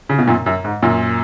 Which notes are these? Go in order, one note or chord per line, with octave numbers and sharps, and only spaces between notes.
C#3
B2
F#2 A#2
F#2
G#2
F#2 A#2